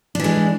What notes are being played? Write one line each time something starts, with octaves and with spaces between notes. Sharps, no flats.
E3 G#3 D4